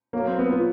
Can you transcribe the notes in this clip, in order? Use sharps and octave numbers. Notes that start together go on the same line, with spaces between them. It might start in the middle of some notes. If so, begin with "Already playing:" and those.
F#3 A#3
C4
B3
F4